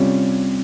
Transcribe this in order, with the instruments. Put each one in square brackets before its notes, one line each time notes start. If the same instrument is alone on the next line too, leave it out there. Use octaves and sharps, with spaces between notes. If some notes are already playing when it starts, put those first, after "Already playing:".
Already playing: [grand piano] C3 G3 C#4 F4 C#5